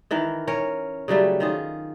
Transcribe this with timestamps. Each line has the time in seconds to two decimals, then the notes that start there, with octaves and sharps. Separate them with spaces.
0.11 D#3 E3 A#4
0.47 C#4 A#4 C#5
1.08 C#3 F#3 G3 A3
1.40 D#3 F4 G#4